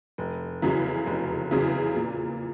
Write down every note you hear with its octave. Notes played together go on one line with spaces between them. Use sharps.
F1
E2 C#3 F#3
F1
E2 C#3 F#3
A#2